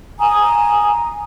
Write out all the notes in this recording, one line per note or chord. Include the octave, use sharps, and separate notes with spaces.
G#5 A#5 D#6